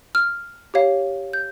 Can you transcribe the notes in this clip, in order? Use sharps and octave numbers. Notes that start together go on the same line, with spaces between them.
F6
G4 C#5 F5
G6